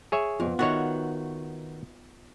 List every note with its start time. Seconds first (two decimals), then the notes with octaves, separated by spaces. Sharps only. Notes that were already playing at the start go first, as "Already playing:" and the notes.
0.12 G#4 C#5 E5
0.40 F2 B3 F4
0.59 D#3 B3 D#4 F#4 C#5 E5